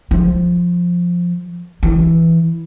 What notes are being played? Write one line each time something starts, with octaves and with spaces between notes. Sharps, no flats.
F3
E3